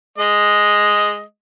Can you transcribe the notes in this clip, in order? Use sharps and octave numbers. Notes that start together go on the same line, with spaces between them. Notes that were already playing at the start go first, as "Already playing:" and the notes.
G#3 D#5